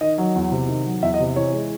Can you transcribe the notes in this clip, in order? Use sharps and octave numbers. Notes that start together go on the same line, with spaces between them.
D#3 D#5
F#3
E2
C3
D#3
F#3
E2 E5
D#5
C3
E3 C#5
G#3